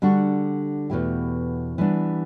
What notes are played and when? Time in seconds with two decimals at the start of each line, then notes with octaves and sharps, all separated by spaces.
0.02 D3 G3 D4 F#4
0.90 E2 B2 A3 E4 G4
1.78 E3 G3 B3 D4